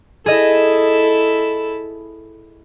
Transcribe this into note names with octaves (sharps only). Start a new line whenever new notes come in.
E4 G#4 A4 D#5